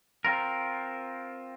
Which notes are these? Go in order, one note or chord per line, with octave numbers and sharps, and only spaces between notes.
C4 F4 A#4